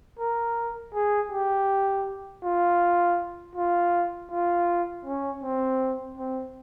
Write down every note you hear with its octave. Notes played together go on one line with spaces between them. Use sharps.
A#4
G#4
G4
F4
F4
F4
C#4
C4
C4